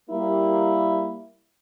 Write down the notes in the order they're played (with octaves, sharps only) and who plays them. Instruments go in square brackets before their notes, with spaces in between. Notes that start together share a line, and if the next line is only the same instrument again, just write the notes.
[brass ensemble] G3 A#3 [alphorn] E4